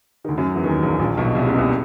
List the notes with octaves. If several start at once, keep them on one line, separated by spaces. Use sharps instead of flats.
D#3
D2 D3
F#2 F#3
E2 E3
D#2 D#3
A#1 A#2
A#1 A#2
B1 B2
C2 C3
C#2 C#3
C2 C3